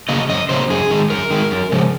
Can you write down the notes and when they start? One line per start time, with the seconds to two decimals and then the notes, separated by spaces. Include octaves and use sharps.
0.09 C#3 F#3 A#3 D#5
0.29 F#2 D#5
0.49 C#3 F#3 A#3 C5
0.70 F#2 G#4
0.91 D#3 G#3
1.10 F#2 A#4
1.31 D#3 G#3
1.51 F#2
1.72 C#3 F3 G#3